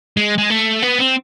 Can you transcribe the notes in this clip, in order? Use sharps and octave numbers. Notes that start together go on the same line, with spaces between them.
G#3
G#3
A3
B3
C4